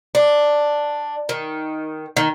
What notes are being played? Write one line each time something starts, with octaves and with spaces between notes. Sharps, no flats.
D4
D#3
D#3